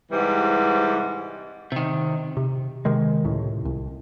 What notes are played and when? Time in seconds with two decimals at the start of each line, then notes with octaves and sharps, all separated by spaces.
0.11 G#2 C3 E3 G3
1.72 C3 D#3
2.37 C3
2.85 C3 D#3 G#3
3.25 C#2 A2
3.65 C2